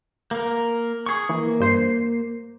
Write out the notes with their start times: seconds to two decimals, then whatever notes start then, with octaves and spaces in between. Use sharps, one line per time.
0.31 A#3 A#4
1.06 G#4 C#6
1.29 E3 A#3
1.60 G2 C5 C7